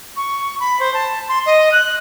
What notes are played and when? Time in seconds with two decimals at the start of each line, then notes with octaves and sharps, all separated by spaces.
0.16 C#6
0.60 B5
0.79 C5
0.93 A5
1.28 C6
1.45 D#5
1.72 F#6